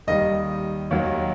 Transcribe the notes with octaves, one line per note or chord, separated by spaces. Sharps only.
D#2 D#3 G3 D#5
D#2 D#3 F#3